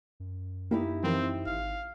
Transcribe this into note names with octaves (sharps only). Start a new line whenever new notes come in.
F#2
F#2 A#3 D#4 E4 G4
E3 F3 C4 A#4
G#1 F5